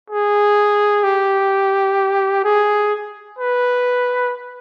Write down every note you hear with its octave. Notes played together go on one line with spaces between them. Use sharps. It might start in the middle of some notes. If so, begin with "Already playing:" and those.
G#4
G4
G#4
B4